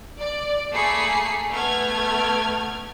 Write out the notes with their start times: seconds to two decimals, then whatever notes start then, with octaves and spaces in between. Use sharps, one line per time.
0.20 D5
0.73 A3 A#3 G#4 B5 C7 C#7
1.53 A3 B3 F6 G#6